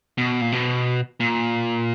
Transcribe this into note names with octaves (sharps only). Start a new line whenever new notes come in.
B2
A#2
B2
A#2